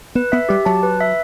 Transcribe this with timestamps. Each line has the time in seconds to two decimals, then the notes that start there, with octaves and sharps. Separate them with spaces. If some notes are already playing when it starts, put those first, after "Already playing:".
0.15 B3 B4
0.32 B3 E5
0.49 G3 G4
0.66 F#3 A5
0.83 B4
1.01 E5